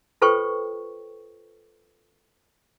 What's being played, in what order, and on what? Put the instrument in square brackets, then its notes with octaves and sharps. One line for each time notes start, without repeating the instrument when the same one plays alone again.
[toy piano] F4 A4 B4 C5 G5 C#6